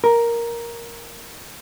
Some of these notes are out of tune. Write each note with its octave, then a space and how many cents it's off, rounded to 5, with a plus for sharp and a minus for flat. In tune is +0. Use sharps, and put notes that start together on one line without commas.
A#4 +5